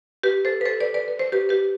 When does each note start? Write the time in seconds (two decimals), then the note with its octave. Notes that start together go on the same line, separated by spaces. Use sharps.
0.23 G4 B4
0.45 A4 C5
0.61 B4
0.65 A4 C5
0.80 B4 D5
0.94 B4 D5
1.08 B4
1.19 C5
1.32 G4 B4
1.49 G4 B4